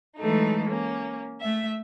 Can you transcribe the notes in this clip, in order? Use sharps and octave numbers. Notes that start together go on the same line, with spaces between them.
E3 F#3 G#3 A3 D#4 A4
A#3 C#4
A3 E5